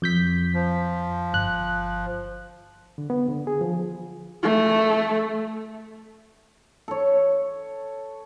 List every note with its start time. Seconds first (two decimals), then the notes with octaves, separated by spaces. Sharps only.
0.02 F2 G6 B6
0.54 F3
1.34 G1 F#6
2.98 D3
3.10 B3
3.29 D3
3.47 G#4
3.61 F3
4.43 A3
6.88 A4 C#5